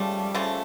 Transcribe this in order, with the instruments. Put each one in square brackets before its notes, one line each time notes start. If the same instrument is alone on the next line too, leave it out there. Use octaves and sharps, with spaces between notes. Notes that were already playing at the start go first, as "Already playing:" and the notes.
Already playing: [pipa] C#3 F3 A3 [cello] G3
[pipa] C#3 F3 A3